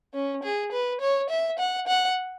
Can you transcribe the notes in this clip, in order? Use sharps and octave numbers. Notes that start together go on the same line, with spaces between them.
C#4
G#4
B4
C#5
E5
F#5
F#5